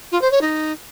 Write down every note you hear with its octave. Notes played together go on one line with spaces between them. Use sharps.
F4
C5
C#5
D#4